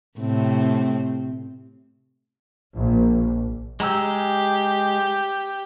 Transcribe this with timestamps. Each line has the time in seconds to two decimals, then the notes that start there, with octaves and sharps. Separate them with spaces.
0.19 A2 C3 C4
2.77 A#1
3.80 G#3 G4 A#5 E6